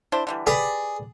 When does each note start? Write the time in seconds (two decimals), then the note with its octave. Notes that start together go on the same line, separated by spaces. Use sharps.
0.12 D4 E4 C5
0.27 D3 E3 G3
0.47 G4 G#4 B4 D5